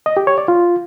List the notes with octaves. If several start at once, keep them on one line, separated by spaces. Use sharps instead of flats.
D#5
G4
C#5
D5
F4